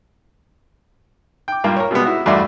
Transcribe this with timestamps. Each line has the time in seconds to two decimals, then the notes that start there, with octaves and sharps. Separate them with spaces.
1.48 G5 D6
1.64 G2 A#2 A#3 G5
1.77 A#4 C#5
1.91 B2 G3 G#3 B3
2.05 E4 F#4
2.26 E2 G2 A3 F#4 D5 C6